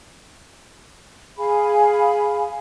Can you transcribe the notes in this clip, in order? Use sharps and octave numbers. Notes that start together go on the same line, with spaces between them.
G#4 F5 G#5 B5